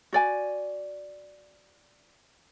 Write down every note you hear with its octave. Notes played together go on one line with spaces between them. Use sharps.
F#4 D5 G#5